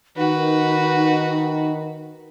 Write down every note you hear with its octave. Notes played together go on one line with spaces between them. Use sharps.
D#3 D#4 F#4 B4